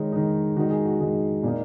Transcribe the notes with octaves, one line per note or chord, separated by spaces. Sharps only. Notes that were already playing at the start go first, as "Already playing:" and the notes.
Already playing: D#3 G#3 D#4 C#5
D#3 G#3 D#4
D#3 G#3 D#4 F#4
G#4
F#4
D#3 G#3 D#4
A#2 A#3 D#4